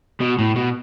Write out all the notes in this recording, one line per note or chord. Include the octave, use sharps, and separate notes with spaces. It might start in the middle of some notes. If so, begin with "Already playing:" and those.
B2
A2
B2